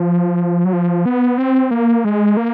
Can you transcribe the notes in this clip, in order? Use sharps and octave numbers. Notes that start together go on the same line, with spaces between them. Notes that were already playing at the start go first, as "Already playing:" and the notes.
Already playing: F3
F#3
F3
B3
C4
A#3
G#3
A#3